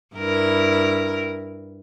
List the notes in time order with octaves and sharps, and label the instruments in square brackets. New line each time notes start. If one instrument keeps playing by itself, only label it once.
[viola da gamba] G2 E4 A#4